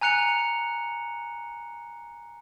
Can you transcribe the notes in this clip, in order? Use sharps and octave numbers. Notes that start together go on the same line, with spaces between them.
G#5 A#5 F#6 C#7 F7